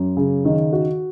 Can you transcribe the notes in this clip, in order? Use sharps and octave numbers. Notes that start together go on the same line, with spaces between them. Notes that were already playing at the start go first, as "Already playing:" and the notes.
Already playing: F#2
C#3
D#3
F#4